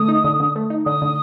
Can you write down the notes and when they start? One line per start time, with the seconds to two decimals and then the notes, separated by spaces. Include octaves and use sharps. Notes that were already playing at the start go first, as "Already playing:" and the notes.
Already playing: D3 A3 D#6
0.08 D#4
0.24 D3
0.40 D3
0.56 A3
0.70 D#4
0.86 D3 D#6
1.02 D3